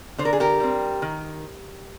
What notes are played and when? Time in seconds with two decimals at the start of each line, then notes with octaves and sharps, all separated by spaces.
0.18 D3 C5
0.25 A#4
0.33 G#4
0.40 G4 A#4
0.60 G3 C4
1.02 D#3